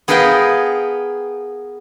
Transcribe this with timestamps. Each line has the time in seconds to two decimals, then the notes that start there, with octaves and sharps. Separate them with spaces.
0.08 B3 G#4 A#4 B4 F5 G5